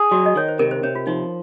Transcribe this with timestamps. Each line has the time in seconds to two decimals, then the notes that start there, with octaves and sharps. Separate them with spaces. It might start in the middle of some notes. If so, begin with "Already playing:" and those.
Already playing: G#4
0.11 F#3 F#4
0.26 D#5
0.36 D#3 C#5
0.48 C5
0.59 C3 A#4
0.71 C5
0.83 C3 C#5
0.95 F4
1.07 F3 D#4